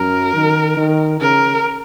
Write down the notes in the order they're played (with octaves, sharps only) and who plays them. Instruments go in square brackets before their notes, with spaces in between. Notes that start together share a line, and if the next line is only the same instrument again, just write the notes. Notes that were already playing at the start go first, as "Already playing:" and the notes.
Already playing: [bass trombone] F#2 [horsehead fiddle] A#4
[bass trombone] D#3
D#3
[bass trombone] C#3 [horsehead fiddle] A#4